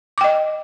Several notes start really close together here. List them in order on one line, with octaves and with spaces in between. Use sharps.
D6 G5 D#5